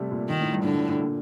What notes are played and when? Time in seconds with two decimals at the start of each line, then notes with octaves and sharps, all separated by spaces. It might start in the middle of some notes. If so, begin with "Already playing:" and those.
Already playing: C3 G3 A3
0.11 A#2
0.29 A#2 D#3
0.41 A2
0.53 G2
0.65 A2 D3
0.76 G2
0.89 A2
1.01 A#2